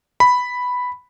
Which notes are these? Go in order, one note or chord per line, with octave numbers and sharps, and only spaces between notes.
B5